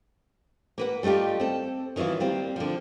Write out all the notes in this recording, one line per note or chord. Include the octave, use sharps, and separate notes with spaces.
A#3 B4 F#5
G3 A3 D#4 F4 G4
C4 A4
D#3 E3 F#3 E4 F4
G3 A#3 C4
D3 F3